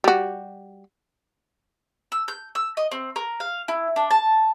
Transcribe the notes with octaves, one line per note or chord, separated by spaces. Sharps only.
G3 F#4
E6
G6
E6
D#5
C4
A#4
F5
E4
D4
A5